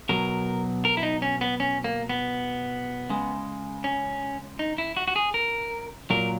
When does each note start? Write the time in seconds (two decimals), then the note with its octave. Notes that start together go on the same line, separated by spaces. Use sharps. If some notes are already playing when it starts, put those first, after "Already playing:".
0.09 B2 F#3 A#4
0.85 A#4
0.97 E4
1.03 D#4
1.22 C#4
1.41 B3
1.60 C#4
1.84 A#3
2.09 B3
3.10 C#3 G#3
3.84 C#4
4.59 D#4
4.78 E4
4.97 F#4
5.08 F#4
5.16 G#4
5.34 A#4
6.10 A#2 F#3 A#4